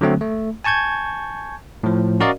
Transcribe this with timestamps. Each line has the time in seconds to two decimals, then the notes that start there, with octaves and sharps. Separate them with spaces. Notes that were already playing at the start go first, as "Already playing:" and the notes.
0.01 D3 F#3 A3 C4
0.21 A3
0.64 G#5 A5 C#6 G6 G#6
1.83 A2 F3
2.20 C#4 F#4 A#4 D5 D#5 F5